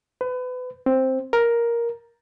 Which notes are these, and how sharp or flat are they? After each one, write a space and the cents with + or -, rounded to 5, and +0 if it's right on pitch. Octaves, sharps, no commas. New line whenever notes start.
B4 +30
C4 +5
A#4 +5